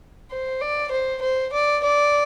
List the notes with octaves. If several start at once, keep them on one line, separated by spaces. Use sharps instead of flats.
C5
D5
C5
C5
D5
D5